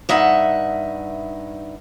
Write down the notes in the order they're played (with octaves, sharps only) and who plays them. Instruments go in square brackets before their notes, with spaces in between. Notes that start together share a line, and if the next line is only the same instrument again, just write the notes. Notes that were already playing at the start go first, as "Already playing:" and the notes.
[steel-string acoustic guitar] G2 D#4 E5 F#5